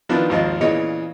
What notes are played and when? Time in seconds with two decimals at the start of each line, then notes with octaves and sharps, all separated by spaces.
0.09 D#3 F3 B3 D4 E4
0.29 G#1 D#2 F3 C5 D#5
0.61 A#2 C#3 E3 B3 C#5 D#5